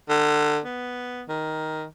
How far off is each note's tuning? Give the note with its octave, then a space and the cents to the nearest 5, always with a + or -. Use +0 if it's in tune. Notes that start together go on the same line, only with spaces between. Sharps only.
D3 +25
B3 +0
D#3 +5